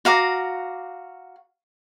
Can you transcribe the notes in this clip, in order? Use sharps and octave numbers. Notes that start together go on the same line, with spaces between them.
F#4 F5 A#5 D6